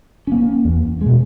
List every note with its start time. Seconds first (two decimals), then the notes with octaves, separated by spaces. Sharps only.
0.27 A#3 C#4
0.65 E2
1.01 B2 G#3